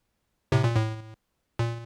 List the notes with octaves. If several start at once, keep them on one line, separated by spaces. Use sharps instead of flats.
A2 C3
A#2
A2
A#2